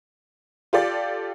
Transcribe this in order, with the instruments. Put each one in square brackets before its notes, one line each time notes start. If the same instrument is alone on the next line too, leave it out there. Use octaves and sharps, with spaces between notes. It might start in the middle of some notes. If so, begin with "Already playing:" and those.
[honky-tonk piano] F4 G4 A4 D5